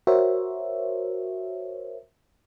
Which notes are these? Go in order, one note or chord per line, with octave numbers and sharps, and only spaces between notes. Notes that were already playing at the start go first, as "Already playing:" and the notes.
F#4 A#4 C5 C#5 E5